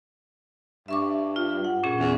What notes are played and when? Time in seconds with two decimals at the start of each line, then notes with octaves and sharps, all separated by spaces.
0.88 G2 E5 C#6 D6
1.36 F4
1.65 F#5
1.83 A#2 C#4 G#4
2.00 E2